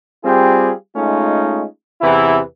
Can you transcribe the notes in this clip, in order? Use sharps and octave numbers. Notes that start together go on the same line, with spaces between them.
G3 C4 F4 G4 G#4
G#3 A3 C#4 D#4 F4
E2 C3 E3 B3 E4